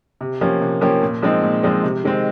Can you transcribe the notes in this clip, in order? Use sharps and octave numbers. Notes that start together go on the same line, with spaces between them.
C3
F3 A#3 C#4 G4
C3
F3 A#3 C#4 G4
A#2
F3 G#3 C4 D#4
A#2
F3 G#3 C4 D#4
C3
D#3 G#3 C4